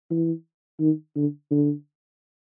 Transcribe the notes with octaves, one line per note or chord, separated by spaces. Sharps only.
E3
D#3
D3
D3